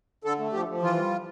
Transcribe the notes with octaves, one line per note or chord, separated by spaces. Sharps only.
D3 A4
A3
F3 G4
F3
E3 F4
G3